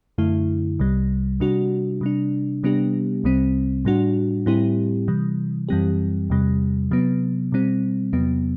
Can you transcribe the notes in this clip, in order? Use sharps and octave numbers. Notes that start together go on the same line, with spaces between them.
F#2 D3 A3 E4
C2 C3 G3
C3 G3 D4 F#4
C3 G3 D4
C3 G3 B3 D4 G4
C2 C3 G3 C4
A2 G3 D4 F#4
A2 G3 C4 E4 G4
C3 E3 G3
F#2 E3 G3 C4 G4
E2 C3 G3
C3 F#3 B3
B2 G3 C4
E2 C3 F#3 B3